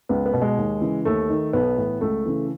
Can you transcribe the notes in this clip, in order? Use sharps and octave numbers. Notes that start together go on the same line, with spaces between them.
C#2 B3
B3
B2
G#3
D#2
C#3 E3
D#2 A3
D#3
B1 B3
A2 E3
C#2 A3
C#3 E3